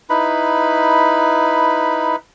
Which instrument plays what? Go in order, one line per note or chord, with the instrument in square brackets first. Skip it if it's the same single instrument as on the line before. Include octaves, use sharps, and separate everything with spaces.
[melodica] D#4 E4 B4 B5